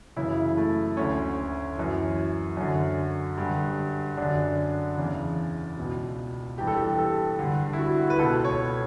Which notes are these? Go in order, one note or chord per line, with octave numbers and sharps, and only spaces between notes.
F#2 C#3 E3 E4
A3
D2 D3 C#4
F#2 E3
F#2 D3
G2 D3
F#2 D3 D4
E2 C#3 E3
C#2 B2
G2 E3 G4
A4
G4
A4
G2 D3
E4
F#4
B4
C#2 B2 A4
C#5